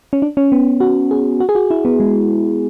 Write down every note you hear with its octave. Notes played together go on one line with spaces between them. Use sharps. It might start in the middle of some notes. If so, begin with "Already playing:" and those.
C#4
D4
C#4
B3
F#4
G#4
F#4
G#4
F#4
E4
B3
G#3